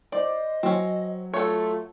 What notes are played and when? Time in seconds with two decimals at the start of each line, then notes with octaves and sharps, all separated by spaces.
0.12 C5 D5 D#5
0.63 F#3 C4 C#4
1.34 A3 F4 A4 C#5